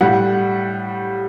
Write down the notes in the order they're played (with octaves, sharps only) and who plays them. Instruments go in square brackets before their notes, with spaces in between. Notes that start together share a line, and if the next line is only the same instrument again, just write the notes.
[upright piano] A2 G3 F#5